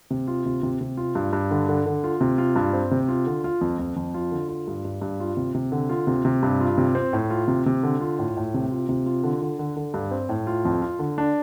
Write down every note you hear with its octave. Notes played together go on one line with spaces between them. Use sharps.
C3
F4
C3
C3
C3
F4
G2
G2
D3
D3
D3
F4
C3
F4
G2
C4
C3
F4
D3
F4
F2
F2
F2
F4
D3
F4
G2
G2
G2
F4
C3
C3
D3
F4
C3
C3
G2
F4
C3
C4
A2
F4
C3
C3
D3
F4
A2
A2
C3
F4
C3
F4
D3
D3
D3
D3
G2
C4
A2
F4
F2
F4
D3
D4